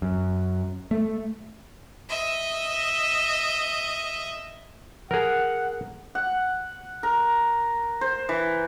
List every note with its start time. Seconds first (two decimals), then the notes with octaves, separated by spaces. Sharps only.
0.02 F#2
0.91 A3
2.09 D#5 E5
5.11 G#4 A#4 F#5
6.15 F#5
7.03 A#4
8.01 C5
8.29 E3